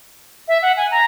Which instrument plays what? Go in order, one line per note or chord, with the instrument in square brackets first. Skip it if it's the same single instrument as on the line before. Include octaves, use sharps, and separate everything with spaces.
[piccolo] E5
F#5
G#5
A#5